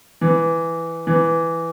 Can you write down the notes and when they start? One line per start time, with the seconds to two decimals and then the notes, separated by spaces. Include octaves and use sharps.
0.21 E3
1.07 E3